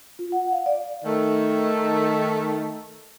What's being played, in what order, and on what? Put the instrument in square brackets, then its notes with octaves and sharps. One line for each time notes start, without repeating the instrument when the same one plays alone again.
[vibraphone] F4
F#5
F5
D5
[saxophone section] D#3 A3